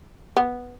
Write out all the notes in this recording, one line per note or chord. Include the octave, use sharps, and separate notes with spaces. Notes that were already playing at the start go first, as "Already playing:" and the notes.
B3